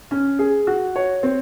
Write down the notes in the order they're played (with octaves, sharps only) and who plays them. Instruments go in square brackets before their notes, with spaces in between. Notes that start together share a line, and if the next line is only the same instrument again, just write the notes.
[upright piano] C#4
G#4
F#4
C#5
C4